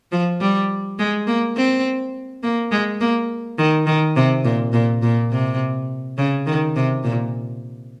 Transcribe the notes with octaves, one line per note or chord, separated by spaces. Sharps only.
F3
G3
G#3
A#3
C4
A#3
G#3
A#3
D#3
D#3
C3
A#2
A#2
A#2
C3
C#3
D#3
C3
A#2